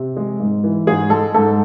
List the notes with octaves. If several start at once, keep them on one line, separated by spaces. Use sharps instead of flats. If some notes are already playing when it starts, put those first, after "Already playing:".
Already playing: C3
G#3
G#2
E3
G#2 G#4
G#3 A4
G#2 A4